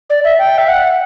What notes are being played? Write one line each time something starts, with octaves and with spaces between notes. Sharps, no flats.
D5
E5
G5
E5
F#5